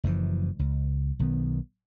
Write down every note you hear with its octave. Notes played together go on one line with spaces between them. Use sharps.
F#1 F#2 E3 F3
C#2
B1 D#3 B3